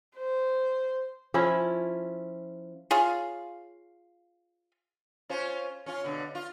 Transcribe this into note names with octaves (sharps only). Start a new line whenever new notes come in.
C5
F3 C#4 E4
F4 G#4 C#5 F5
C#4 F4 C5
C#4 F4
B2 D3
F4